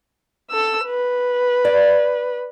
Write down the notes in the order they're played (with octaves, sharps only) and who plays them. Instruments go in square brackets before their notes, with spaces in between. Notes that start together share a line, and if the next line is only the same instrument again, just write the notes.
[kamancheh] A4 E6
B4
[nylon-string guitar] D5